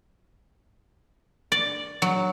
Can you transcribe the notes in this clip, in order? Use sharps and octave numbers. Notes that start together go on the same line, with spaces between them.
D5
F#3